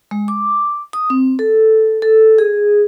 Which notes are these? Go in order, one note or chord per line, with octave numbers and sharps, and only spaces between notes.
G#3
D6
D#6
C4
A4
A4
G#4